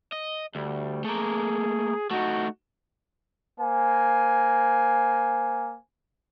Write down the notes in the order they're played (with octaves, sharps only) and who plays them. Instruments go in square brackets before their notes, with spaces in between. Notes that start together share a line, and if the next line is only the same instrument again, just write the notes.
[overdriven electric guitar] D#5
[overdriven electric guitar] D2 [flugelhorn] G3
[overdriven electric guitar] A3 A#3 [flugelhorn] G#4
[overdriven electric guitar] A3 D#4 [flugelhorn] F#4
[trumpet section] A#3 C5 G#5